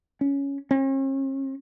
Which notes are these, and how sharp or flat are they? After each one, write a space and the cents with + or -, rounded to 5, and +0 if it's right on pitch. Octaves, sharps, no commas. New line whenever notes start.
C#4 +5
C#4 -45